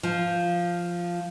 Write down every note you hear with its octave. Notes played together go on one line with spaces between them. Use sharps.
F3